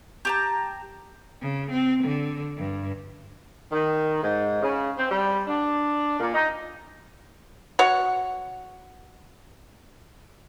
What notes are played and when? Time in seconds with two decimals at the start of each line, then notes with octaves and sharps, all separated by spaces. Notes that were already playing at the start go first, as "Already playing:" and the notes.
0.25 G4 A5 A#5
1.41 C#3
1.70 C4
2.03 D3
2.57 G2
3.72 D#3
4.23 G#2
4.62 C#3
4.98 C4
5.11 G3
5.48 D4
6.20 A#2
6.34 D#4
7.79 F#4 C#5 F#5